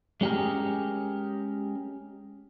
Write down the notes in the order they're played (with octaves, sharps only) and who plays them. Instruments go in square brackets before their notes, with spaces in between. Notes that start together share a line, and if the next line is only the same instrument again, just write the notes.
[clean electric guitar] G#3 C#4 G4 G#4 A#4